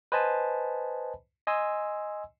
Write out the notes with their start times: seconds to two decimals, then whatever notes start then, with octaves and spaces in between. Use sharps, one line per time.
0.12 B4 C5 D#5 G#5 A5 B5
1.47 D#5 G#5 C6 E6